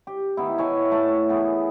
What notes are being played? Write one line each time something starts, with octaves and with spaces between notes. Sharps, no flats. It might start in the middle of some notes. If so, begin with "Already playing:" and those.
G4
D#3 B3 E4
E4 C#5 G#5 A5
A3 A5
E3 B3 G#4